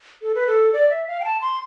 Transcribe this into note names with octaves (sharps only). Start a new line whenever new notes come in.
A4
B4
A4
D5
E5
F5
G5
A5
C6